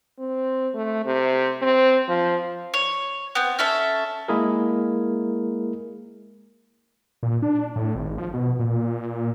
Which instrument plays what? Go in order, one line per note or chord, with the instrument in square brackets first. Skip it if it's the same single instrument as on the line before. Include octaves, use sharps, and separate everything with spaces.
[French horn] C4
A3
C3
C4
F3
[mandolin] C#5
B3 C4
C#4 A4 E5
[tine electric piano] G#3 A#3 E4 G#4 A#4
[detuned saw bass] A#2
D4
A2
G#1
F3
B2
A#2